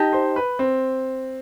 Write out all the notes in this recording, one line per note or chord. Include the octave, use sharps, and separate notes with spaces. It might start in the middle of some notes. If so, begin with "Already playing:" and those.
Already playing: D#4 G4 D#5 A5
C5
B4
C4